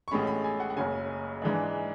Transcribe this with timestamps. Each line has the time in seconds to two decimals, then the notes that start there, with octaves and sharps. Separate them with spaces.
0.08 C#6
0.11 A1 A2 G#3 C#4 B5
0.27 B5
0.44 G#5
0.60 F#5
0.70 F#5
0.77 F#1 F#2 C#3 G#5
1.42 G#2 E3 G#3 D4